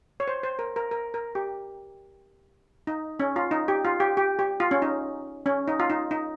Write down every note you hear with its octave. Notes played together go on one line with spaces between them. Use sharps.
C#5
C5
C5
A#4
A#4
A#4
A#4
G4
D#4
C#4
F4
D#4
G4
F4
G4
G4
G4
F4
C#4
D#4
C#4
D#4
F4
D#4
D#4